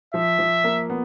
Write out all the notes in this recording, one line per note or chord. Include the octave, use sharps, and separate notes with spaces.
F3 E5
F3
A#3
B3